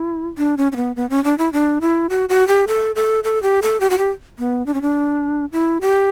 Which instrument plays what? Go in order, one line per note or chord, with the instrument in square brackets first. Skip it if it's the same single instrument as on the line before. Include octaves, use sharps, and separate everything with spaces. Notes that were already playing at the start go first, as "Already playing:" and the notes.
Already playing: [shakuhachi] E4
D4
C#4
C#4
B3
B3
C#4
D4
E4
D4
E4
F#4
F#4
G4
A4
A4
A4
G4
A4
G4
F#4
G4
B3
D4
C#4
D4
E4
G4